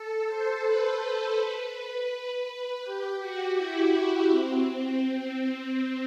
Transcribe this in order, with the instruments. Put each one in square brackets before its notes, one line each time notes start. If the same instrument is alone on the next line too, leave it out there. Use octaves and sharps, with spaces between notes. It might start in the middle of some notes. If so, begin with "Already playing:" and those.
Already playing: [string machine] A4
C5
B4
B4
G4
F#4
E4
E4
C4
C4